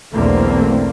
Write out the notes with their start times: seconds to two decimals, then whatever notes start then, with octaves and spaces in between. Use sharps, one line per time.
0.13 B1 E2 D3 A3 A#3 C4